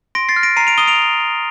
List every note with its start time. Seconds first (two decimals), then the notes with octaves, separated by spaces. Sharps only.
0.15 C6 A#6 D7
0.29 A6 C7
0.36 F6
0.43 A#6 D7
0.56 A#5 C7 D#7
0.67 D7 F7
0.78 D#6 D#7 G7
0.87 D7 F7